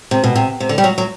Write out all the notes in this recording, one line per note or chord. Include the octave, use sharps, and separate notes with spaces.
C3
B2
C3
C3
D3
G3
F#3
F#3